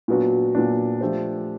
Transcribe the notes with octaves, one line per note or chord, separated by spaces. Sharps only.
A#2 F#3 B3 D4 F#4
A#2 F#3 B3 D4 F#4
F3 A3 D4 G4 C5